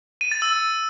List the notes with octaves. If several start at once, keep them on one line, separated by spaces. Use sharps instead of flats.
D#7
A6
E6